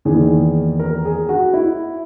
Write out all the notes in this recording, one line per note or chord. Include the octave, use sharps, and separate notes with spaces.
E2 D#3 A#3 G#4
A#4
G#4
F#4
E4